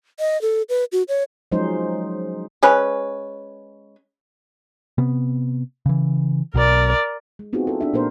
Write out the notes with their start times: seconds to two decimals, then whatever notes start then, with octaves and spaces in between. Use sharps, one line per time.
0.19 D#5
0.42 A4
0.69 B4
0.92 F#4
1.08 C#5
1.52 F3 F#3 G#3 C#4 D#4 C5
2.63 G#3 C#4 B4
4.98 C3 B3
5.86 C#3 E3
6.54 B1 B2 A#4 D5
7.39 G#3
7.53 B3 C4 D#4 F4 F#4 G#4
7.67 E4 A4
7.81 D4 E5
7.93 A#2 A#3 D4 A#4 C5